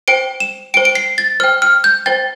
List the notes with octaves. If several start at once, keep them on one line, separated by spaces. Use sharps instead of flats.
C5 G5 D7
E7
C5 G5 D7
D7
C7
A6
C5 G5 F6
F6
G6
C5 G5 A6